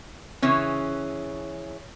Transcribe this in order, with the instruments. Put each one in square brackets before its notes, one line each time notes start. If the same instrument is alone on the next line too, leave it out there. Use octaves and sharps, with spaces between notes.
[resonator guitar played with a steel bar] C#3 E3 C#4